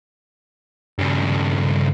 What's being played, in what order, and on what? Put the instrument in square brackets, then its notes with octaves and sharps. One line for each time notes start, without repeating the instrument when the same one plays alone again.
[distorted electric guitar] G2 C#3